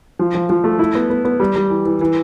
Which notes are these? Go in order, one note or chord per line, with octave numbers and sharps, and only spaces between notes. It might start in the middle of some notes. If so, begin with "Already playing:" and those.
F3
F3
F3
A3
E4
B3
B3
B3
G3
G3
E3
E3
E3